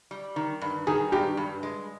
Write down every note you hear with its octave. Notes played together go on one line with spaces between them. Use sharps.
G3
D#3
G2
D#3 G#4
G2 G4
G2
G#3